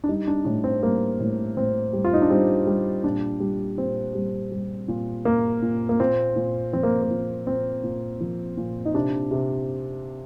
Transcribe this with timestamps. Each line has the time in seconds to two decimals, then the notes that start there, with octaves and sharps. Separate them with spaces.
0.04 D4
0.09 G3 D#4
0.27 D4
0.45 A2 D4
0.64 C4
0.82 G3 A#3
1.20 A2
1.56 A2 C4
1.93 G3
2.05 F4
2.13 D#4
2.22 D4
2.30 G3 C4
2.67 G3
3.04 A#2 D4
3.40 G3
3.77 A#2 C4
4.15 G3
4.52 G3
4.88 A#2
5.25 A#2 A#3
5.62 A#2
5.89 A#3
6.00 A#2 C4
6.36 A#2
6.73 F3 C4
6.83 A#3
7.02 A#3
7.10 A#2
7.47 A#2 C4
7.84 A#2
8.20 F3
8.57 A#2
8.85 D#4
8.94 C3 D4
9.31 C3